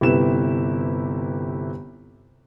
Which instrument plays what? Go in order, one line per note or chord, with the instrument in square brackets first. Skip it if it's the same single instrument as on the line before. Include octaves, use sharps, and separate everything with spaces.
[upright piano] G1 C3 E4 G4 B4 E7